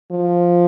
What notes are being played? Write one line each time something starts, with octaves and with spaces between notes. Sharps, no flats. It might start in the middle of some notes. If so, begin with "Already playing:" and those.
F3